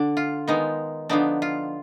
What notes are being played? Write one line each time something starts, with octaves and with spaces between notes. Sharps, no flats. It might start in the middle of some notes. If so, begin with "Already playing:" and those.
Already playing: D3 D4
F4
D#3 G#3 B3 D#4
D3 F3 B3 D4 D#4
F4